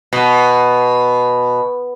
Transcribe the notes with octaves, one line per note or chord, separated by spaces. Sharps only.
B2